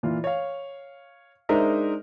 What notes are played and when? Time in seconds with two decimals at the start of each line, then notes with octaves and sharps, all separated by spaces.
0.03 A#2 E3 F4
0.24 C#5 F5
1.49 G#3 D4 D#4 A#4 C5 E5